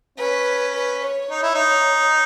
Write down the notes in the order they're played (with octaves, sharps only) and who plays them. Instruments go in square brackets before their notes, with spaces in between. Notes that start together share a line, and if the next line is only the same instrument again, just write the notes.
[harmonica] C#4 [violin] B4
[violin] B4
C#5
[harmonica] D#4
E4
D#4